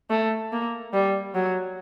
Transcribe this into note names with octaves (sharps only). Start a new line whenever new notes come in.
A3
A#3
G3
F#3